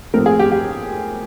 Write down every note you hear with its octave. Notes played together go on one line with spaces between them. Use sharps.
A2 F3 A3 C4 A#4
G#4
G4
G4